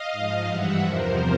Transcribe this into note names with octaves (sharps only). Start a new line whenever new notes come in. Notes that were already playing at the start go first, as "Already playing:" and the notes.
Already playing: D#5 F5
G#2 F3
G2 E3 G3 E5 F#5
E2 C3 F3 A#4 C5